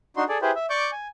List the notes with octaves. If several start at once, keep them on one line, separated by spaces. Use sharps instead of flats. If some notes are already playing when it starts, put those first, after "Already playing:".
D4 D#4 F#4 C6
G#4 A4 D5
E4 G4 G#4 B4 C5
E5
D5 C#6 D6 G6
G#5